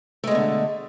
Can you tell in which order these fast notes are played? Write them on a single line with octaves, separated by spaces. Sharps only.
A3 G#3 B2 D3